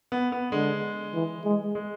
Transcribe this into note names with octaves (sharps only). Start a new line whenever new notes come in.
B3
B3
D3 G#3
E3
G#3
G#3